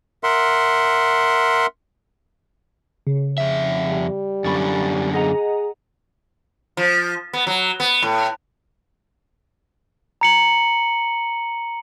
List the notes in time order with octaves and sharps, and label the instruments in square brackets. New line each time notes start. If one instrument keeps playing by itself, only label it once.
[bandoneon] A#4 E5 F#5 C6
[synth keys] C#3
[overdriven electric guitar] F2 E5
[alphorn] G3
[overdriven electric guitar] F#2 D3 [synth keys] B5 C#6 A6
[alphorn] G#4 [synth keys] D#5 F#5 A#5
[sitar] F3
B3
F#3
B3
A2
[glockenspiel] A#5 C#7 F#7